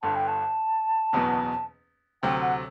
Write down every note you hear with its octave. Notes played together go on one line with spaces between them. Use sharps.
G1 G2 D3 A5
G5
A5
F#1 E2 B2 F#3 B3
D2 C3 F#3 G5
F#5